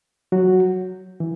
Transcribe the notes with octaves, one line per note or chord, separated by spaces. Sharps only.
F#3 F#4
E3